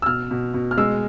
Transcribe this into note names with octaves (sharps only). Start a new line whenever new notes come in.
E6
B2 F6
B2
B2
F6
G#3 E6